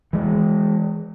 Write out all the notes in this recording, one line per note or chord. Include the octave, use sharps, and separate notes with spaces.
E3 G#3